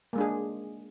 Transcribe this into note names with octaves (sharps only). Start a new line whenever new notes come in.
G#3 A#3 D4 G#4